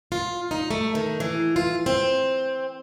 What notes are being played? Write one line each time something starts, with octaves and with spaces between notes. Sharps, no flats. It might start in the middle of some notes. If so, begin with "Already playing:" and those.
F4
D#4
A3
D#3
E3
F4
C4